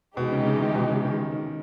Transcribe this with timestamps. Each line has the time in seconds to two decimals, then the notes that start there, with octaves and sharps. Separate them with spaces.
0.17 B2 E3 G#3 D#4 G4
0.32 C#3
0.47 C#3
0.61 D#3
0.76 B2
0.90 C#3
1.05 D#3